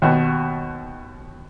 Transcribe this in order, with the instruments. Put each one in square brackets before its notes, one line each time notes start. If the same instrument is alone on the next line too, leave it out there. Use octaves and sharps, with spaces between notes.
[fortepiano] D#2 B2